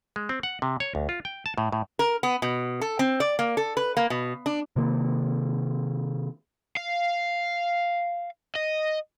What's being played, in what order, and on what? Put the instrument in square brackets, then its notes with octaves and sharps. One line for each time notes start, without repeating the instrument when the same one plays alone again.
[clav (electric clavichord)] G#3
C4
F#5
C3
C#5
D2
F4
G5
A5
A2
A2
[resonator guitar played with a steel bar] A#4
B3
B2
A4
C4
D5
A#3
A4
B4
A#3
B2
D4
[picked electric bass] C3 D#3 A#3
[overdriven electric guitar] F5
D#5